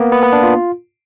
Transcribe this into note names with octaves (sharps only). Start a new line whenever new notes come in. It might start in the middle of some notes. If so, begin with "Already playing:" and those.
Already playing: A#3 B3
B3
B3
D4
F4